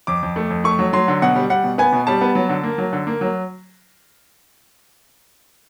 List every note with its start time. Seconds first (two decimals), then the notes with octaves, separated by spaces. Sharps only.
0.07 F2 D6
0.22 F2
0.36 A3
0.50 F2
0.64 A3 C#6
0.79 F#3
0.93 F#3 C6
1.08 D3
1.22 B2 F#5
1.36 G3
1.50 G3 F#5
1.64 B2
1.78 B3 G#5
1.93 B2
2.07 G3 A5
2.21 B3
2.35 F#3
2.49 D3
2.63 A#3
2.78 F#3
2.93 D3
3.07 A#3
3.21 F#3